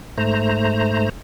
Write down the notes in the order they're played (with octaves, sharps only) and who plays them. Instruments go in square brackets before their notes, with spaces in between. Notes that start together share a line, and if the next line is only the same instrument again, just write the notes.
[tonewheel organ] G#2 A3 C5 A#5